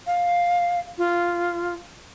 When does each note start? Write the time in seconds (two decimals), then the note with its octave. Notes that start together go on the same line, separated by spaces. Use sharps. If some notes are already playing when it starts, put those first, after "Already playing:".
0.07 F5
0.98 F4